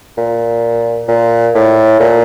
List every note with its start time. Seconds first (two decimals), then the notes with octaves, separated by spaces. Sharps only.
0.17 A#2
1.08 A#2
1.55 A2
2.00 A#2